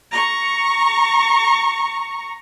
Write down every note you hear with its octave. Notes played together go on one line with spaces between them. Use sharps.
A#5 C#6